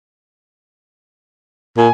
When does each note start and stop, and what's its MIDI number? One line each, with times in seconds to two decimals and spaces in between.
1.77 1.88 46
1.77 1.92 80